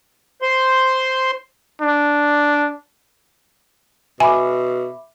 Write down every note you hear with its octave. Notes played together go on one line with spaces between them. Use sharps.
C5 C6
D4
B2 E5 G#5 B5 D6